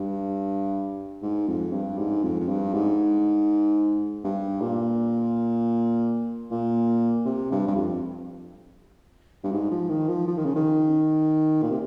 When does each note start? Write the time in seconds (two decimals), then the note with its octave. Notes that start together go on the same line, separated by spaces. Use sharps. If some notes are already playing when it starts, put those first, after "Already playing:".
Already playing: G2
1.22 G#2
1.47 F2
1.72 G2
1.98 G#2
2.23 F2
2.40 F2
2.49 G2
2.74 G#2
4.24 G2
4.61 A#2
6.51 A#2
7.25 C3
7.51 G2
7.67 G2
7.76 F2
9.44 G2
9.52 G#2
9.71 F3
9.90 D#3
10.08 F3
10.27 F3
10.38 D#3
10.45 C#3
10.56 D#3
11.62 A#2
11.71 C3